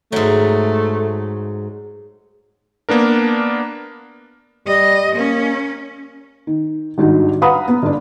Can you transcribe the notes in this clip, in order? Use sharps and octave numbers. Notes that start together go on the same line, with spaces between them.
G#2 F#3 A3
A#3 B3 D4 A#4
G3 D#5
A#3 C#4
D#3
G#1 G2 D#4 F#4
B4 F5 F#5 A#5 B5 D#6
B3
G1 D4